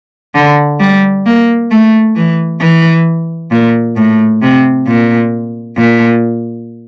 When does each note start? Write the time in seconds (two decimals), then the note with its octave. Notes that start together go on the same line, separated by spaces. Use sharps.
0.35 D3
0.80 G3
1.26 A#3
1.71 A3
2.16 E3
2.61 E3
3.51 A#2
3.97 A2
4.42 C3
4.87 A#2
5.77 A#2